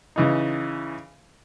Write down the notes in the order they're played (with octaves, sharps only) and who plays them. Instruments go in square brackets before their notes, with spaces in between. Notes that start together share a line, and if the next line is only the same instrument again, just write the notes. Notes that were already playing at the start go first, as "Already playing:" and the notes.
[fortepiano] C#3 E3 D#4